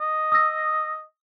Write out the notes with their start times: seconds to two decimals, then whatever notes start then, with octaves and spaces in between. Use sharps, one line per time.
0.01 D#5
0.32 D#6 E6 A#6